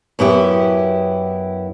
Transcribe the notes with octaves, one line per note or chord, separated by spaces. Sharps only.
F#2 B3 E4 G4